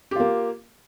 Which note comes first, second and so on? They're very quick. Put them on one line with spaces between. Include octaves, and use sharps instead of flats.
G4 F4 A#3